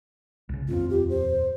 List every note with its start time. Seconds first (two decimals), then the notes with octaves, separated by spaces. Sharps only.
0.49 C2 C#3
0.68 D#1 F2 C4 F4
0.90 G4
1.09 C5